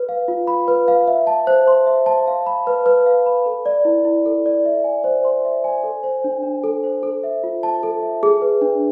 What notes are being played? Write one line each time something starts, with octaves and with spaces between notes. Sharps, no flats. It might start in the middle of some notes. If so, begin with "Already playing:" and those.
Already playing: B4
F5
F4
B5
B4
F5
E5
A5
C5
C6
E5
A5
F5
B5
B4
B4
F5
B5
A4
D5
E4
E4
A4
D5
E5
G#5
C5
C6
E5
G#5
A4
C5
D4
D4
A4
C5
A4
E5
F4
A5
A4
E5
G#4
B4
D4